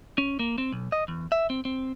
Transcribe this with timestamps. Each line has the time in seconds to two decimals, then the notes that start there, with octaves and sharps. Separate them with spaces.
0.18 C#4
0.39 A#3
0.58 C4
0.72 B1
0.92 D#5
1.08 E2
1.32 E5
1.50 C4
1.65 C4